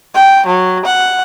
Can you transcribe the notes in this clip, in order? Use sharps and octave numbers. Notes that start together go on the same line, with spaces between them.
G5
F#3
F#5